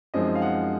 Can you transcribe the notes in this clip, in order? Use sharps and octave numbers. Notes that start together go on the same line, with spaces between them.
F#2 F3 G#3 C4 D#4 D#5
F5
F#5